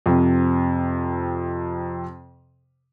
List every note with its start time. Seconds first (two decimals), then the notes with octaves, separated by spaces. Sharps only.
0.06 F2 C3